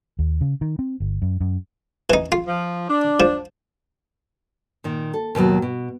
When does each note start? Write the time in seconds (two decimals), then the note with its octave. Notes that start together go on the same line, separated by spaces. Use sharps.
0.19 D#2
0.41 C#3
0.61 D#3
0.79 C4
1.00 G1
1.22 F#2
1.40 F#2
2.10 E3 D#4
2.32 F4
2.47 F3
2.88 D4
3.20 F3
4.84 A#2 D#3
5.13 A4
5.35 D#2 B2 D#3 F#3
5.62 B2